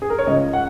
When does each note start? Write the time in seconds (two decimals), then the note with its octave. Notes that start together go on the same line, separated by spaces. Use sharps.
0.02 G#4
0.10 A#4
0.19 C#5
0.27 C#2 C#3 G#3 D#5
0.53 F#5